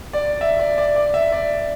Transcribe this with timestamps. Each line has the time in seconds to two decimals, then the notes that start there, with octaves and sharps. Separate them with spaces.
0.13 D5
0.41 E5
0.59 D5
0.78 D5
0.96 D5
1.14 E5
1.32 D5